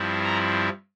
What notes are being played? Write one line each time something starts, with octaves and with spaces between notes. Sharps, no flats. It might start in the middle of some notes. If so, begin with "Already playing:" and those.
Already playing: G2 F3 C4 E4
A#5